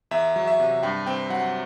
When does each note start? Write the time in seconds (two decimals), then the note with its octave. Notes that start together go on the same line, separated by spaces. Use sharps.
0.11 E2 E5
0.36 F#3
0.47 E5
0.60 C3
0.83 G2 G5
1.06 C4 G5
1.30 F#3 F#5